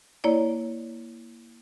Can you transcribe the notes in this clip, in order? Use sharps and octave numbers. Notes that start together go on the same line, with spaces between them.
A#3 E4 C#5 D5